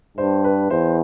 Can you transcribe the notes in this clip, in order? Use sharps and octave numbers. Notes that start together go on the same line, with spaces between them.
G2 C5
B4
E2 C5